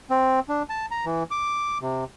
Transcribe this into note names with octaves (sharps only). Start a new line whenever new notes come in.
C4
D4
A5
A#5
E3
D6
C3